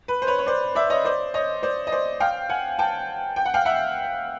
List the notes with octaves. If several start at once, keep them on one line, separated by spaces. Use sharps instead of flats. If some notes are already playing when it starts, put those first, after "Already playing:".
B4
C5
B4 C#5
C#5
C5 D5
D5 E5
C#5 D#5
C5 D5
C#5 D#5
C5 D5
D#5
C5 D5
F5 G5
F#5 G#5
G5 A5
G5
F#5
F5 G5
E5 F#5